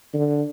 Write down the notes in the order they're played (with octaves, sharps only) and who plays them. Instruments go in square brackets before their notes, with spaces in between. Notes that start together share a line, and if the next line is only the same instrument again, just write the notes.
[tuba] D3